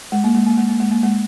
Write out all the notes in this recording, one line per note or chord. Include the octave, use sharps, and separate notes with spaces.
G#3
A#3
G#3
A#3
G#3
A#3
G#3
A#3
G#3